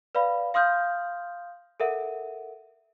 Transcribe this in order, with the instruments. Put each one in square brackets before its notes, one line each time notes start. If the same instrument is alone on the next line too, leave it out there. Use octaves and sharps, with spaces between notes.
[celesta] B4 D5 F5 B5
F5 C6 D#6 F6 G6
A4 A#4 E5 F#5